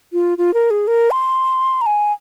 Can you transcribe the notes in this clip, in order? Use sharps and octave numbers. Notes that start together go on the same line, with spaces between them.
F4
F4
A#4
G#4
A#4
C6
A#5
G#5